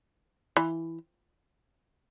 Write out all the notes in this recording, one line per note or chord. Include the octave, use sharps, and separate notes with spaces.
E3